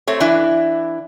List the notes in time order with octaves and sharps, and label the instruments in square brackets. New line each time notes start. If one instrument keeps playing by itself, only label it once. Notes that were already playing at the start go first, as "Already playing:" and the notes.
[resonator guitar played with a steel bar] A3 C4 C#5
E3 D4 E4